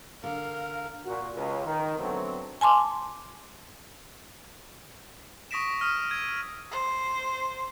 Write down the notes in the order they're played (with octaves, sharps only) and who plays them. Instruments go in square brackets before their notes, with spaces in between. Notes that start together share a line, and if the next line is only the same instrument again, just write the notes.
[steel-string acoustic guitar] D3 [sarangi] A#4 [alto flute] F5
[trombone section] A#2 F#4
C#2
D#3
D3 F#3 A3 B3 C4
[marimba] G#5 A5 C6 D6
[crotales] C#6 D#6 A#6 B6 D7 E7
D#6 F6 D#7
E6 G#6 D#7
[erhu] C5